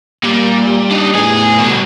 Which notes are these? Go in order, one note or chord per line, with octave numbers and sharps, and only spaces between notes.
A#2 G3
D4 D#4
A2 B3 G#4
B2 D3 G3 F#4